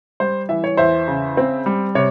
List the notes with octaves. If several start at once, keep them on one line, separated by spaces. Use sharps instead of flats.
G3 C5
E3 E5
C#5
E2 C5 E5
C#3
C4
G3
C3 C#5